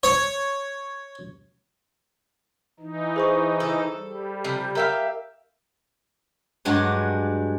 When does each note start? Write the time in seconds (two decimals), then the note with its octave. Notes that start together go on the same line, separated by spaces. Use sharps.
0.03 C#5
2.80 E3 D#4
3.16 G#4 C5 C#6
3.60 A4
3.95 G3
4.44 C3 F3
4.75 G4 A#4 E5 F5 A#5
6.65 G2 F#3 G#3 D4 C#5